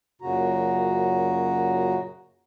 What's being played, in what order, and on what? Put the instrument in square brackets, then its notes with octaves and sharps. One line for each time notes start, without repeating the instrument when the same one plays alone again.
[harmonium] F#2 A#2 C#3 F#4 A#5